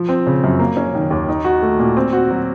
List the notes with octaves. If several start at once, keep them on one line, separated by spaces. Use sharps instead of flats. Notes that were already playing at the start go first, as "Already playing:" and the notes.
Already playing: F3
C4
C#3
F#2
A#3
C#4
D#3
D#2
D#4
F#4
A3
A#2
C4
F#4
F#3